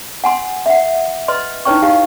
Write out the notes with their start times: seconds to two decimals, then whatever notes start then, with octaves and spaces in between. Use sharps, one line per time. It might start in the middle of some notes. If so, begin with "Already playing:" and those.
0.24 F#5 G#5 C6
0.66 E5 F#5
1.28 B4 D#5 C6
1.65 D#4 E4 B4 C#5 G5 C#6
1.82 D#4 G4 F5